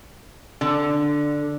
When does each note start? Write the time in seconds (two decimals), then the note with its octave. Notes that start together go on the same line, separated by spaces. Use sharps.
0.61 D3